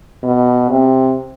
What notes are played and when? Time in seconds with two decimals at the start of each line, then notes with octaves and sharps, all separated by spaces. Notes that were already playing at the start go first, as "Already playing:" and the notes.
0.23 B2
0.70 C3